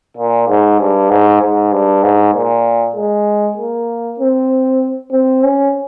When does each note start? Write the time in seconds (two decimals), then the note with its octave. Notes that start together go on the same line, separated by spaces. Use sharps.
0.17 A#2
0.48 G#2
0.80 G2
1.10 G#2
1.41 G#2
1.72 G2
2.03 G#2
2.34 A#2
2.95 G#3
3.57 A#3
4.19 C4
5.12 C4
5.43 C#4